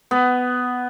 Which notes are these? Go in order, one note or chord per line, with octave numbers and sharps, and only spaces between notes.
B3